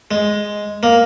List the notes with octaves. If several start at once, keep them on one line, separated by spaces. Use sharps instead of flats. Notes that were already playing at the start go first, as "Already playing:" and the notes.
G#3
A#3